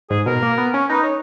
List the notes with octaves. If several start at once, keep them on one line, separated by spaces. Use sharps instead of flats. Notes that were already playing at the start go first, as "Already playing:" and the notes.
G#2 G#4
B2 A#4
A#3
B3
C#4
D#4 B4
C#5